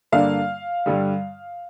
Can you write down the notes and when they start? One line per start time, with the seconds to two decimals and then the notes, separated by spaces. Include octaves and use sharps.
0.12 G2 D3 A#3 D4 F5
0.86 G2 D3 G3